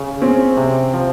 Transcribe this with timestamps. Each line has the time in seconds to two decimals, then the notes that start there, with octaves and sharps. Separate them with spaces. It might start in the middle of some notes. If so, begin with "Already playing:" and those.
Already playing: C#3
0.21 C4 C#4
0.57 C3
0.94 F3